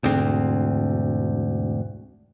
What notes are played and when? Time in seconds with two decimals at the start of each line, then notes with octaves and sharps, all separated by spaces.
0.03 E1 D2 G#2 C4